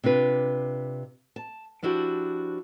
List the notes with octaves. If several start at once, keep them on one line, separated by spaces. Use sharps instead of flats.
C3 D4 F4 B4
A5
F3 D4 E4 F#4 G4